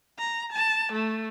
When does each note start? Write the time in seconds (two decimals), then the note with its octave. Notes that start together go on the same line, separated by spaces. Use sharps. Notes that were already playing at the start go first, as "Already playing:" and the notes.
0.18 A#5
0.52 A5
0.92 A3